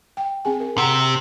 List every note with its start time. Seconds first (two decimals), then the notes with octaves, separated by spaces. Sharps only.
0.17 G5
0.45 C4 G#4 G#5
0.60 A#4
0.78 C3 F#5 A#5